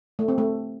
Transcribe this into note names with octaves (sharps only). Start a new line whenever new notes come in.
A3
C4
A3